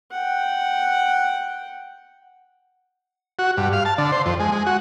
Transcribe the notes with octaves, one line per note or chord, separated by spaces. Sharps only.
F#5 G5
F#4
G2
F5
A5
D3
C5
F2
G#3
G#3
F#4